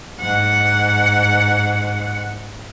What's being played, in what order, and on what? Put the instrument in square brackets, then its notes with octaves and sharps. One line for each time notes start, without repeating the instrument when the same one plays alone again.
[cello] G#2 F#5